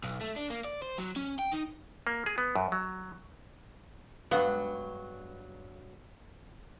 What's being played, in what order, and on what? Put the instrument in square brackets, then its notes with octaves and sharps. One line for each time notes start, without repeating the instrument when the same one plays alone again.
[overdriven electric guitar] B1
A3
D4
A#3
D5
C5
F#3
C#4
G5
D#4
[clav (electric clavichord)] A#3
G#4
B3
F#2
F#3
[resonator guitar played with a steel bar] G2 F#3 [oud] G#3 D5 F5 [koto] B3